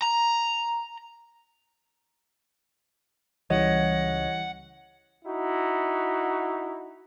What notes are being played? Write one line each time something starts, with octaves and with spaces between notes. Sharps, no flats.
A#5
C#2 C#3 E3 G3 C#5 D#5 F#5
D#4 E4 F#4